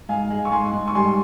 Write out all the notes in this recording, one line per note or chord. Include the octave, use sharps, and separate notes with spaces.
G#2 F5 G#5
G#3
C#6
G#2 G#5 C6
G#2
C#6
G3 G#5 C6